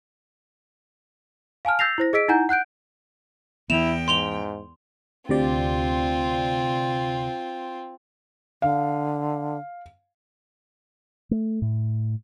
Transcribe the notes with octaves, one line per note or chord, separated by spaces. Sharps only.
F5 G#5 A5 F6
E6 G6 A6 A#6 C7 F7
E4 C5 A#6
G#4 D#5 E6 B6 D7
D#4 E4 F#5 G#5 A#5 G6
F#5 F#6 G6 D7
E2 E3 B3 E4 G5 E7 F7
G#2 C6 F7 G7
D2 C3 C4 F4 D5
D3 F5
A3
A2